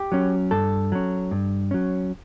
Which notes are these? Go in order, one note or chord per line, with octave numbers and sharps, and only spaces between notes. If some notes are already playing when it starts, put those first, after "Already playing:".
Already playing: G4
F#3 C#4
G2 A4
F#3 C#4
G2
F#3 C#4